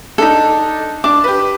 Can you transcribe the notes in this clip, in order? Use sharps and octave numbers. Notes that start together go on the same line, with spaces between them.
D4 D#4 A4
D4 D6
G4 B4